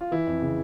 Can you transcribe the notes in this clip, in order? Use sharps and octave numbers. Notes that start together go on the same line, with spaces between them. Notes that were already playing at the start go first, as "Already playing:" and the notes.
F4
E3 E4
F2
C#3